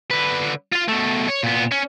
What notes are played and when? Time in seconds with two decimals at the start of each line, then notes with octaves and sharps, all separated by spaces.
0.11 D3 B4
0.72 F4 F5
0.88 B2 A3
1.28 C#5
1.43 A#2 B3
1.72 C#4